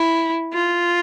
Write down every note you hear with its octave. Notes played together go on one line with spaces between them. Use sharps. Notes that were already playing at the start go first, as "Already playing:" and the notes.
Already playing: E4
F4